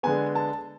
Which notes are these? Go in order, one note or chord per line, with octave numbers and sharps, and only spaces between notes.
D3 G#3 B3 G#5
A5